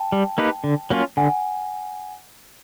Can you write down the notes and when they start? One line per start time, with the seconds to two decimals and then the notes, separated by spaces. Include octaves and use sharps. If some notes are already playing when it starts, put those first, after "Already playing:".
Already playing: G5 A5
0.12 G3
0.38 A#3 D#4 G4 B4
0.64 D3
0.90 F#3 A#3 C#4 F4
1.17 D3 F#5 G#5